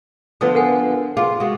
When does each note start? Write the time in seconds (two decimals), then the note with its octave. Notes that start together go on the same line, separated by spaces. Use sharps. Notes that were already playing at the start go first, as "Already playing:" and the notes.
0.41 D3 F3 B3 D#6
0.55 A#4 F#5 G#5
1.17 F4 G#4
1.40 G#3 F#4